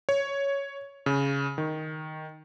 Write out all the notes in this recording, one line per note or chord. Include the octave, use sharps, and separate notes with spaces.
C#5
C#3
D#3